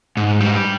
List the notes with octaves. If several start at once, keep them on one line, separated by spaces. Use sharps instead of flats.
G#2
G3